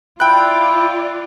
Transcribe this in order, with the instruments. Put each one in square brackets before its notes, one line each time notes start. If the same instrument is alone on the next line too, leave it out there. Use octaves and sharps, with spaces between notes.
[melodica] E4 [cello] F4 D5 [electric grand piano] G5 F#6